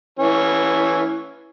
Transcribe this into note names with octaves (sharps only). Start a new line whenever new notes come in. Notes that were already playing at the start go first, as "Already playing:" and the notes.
E3 C#4